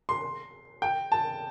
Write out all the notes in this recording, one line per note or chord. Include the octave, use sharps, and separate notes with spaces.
C6
G5
A5